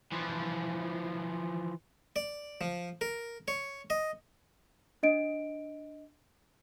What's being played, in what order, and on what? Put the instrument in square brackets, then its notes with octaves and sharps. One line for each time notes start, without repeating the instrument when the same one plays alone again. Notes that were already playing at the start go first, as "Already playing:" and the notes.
[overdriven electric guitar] E3 F3
[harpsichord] D5
F3
A#4
C#5
D#5
[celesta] D4 D#5 D7